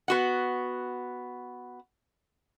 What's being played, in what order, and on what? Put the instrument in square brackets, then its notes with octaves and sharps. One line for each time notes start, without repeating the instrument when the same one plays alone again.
[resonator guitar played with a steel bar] B3 F#4 F#5